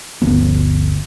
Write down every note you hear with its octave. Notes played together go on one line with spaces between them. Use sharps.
G1 D2 F3 B3